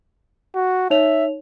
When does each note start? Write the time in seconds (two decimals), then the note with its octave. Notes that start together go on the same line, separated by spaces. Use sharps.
0.55 F#4
0.90 D#4 C#5 E5 F7